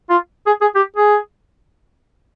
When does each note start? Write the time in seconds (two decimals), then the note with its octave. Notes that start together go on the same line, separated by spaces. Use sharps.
0.10 F4
0.47 G#4
0.61 G#4
0.75 G4
0.96 G#4